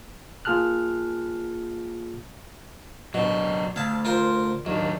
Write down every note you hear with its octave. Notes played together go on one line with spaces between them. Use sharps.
A#3 F4 G#4 A5 F6 F#6
B2 F#3 D4
D2 F5 A5
F4 A#4 C5
D#2 F#3 D4